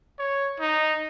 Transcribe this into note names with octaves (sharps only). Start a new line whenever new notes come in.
C#5
D#4